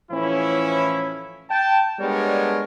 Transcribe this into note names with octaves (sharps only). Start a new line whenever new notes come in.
A2 E3 F3 C#4 E4
G5 A5
G3 G#3 B3 D4 A#4 C#5